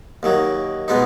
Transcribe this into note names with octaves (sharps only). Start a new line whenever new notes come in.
D#2 D#3 F#3
B2 G#3 B3 D#4